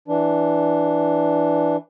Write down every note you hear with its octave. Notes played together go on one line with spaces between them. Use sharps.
E3 D4